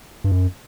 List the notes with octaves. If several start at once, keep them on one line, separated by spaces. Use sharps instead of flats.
G2
F#2